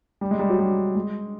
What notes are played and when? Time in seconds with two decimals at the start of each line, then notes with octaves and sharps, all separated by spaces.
0.21 G3
0.31 G#3
0.39 G3
0.50 F#3
0.59 G3
0.95 G#3